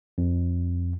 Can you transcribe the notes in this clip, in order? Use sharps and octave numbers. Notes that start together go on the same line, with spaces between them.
F2